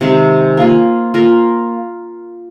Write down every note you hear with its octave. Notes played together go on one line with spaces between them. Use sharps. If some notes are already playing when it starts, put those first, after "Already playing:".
C3 D#3 G#3 C4
A#3 F4 G#4
A#3 F4 A#4